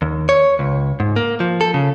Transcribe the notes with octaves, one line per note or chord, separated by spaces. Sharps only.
D#2
C#5
C#2
G#2
A#3
F3
A4
C#3